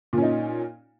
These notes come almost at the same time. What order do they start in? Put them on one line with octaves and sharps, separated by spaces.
A#2 C#4 D#4